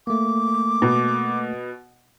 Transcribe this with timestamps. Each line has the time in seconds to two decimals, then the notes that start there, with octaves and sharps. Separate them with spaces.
0.07 A3 A#3 D6
0.82 B2